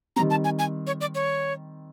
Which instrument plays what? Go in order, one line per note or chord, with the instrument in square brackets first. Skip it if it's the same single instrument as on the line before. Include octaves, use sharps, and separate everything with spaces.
[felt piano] D#3 G3 C4 [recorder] A#5
[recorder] A5
G#5
G#5
C#5
D5
C#5